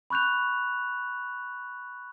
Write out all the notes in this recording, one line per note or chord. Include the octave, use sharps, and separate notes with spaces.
B5 C#6 F#6 G6 F7